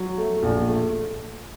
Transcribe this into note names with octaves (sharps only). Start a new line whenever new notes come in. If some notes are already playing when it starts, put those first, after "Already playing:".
Already playing: F#3
A3
A#1
A3